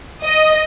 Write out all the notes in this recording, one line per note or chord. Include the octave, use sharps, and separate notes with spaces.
D#5